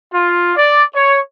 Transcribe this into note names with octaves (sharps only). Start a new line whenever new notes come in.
F4
D5
C#5